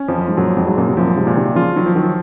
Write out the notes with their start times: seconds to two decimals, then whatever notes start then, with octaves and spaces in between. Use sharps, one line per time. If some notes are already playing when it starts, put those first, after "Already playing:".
Already playing: C#4
0.08 F2 F3
0.18 F#2
0.28 G#2
0.37 F#2 A#2 F#3
0.57 F2 G#2
0.67 G#2 F#3
0.77 F#2 A#2
0.88 C3
0.97 F#2 A#2 F3
1.16 G#2 C3
1.27 A#2
1.36 C3 D#3
1.56 C#3 F3 F4
1.76 D#3 F#3
1.86 F3
1.95 D#3 F#3